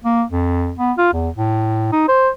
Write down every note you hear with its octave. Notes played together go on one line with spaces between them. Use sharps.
A#3
F2
B3
F4
E2
A2
D#4
C5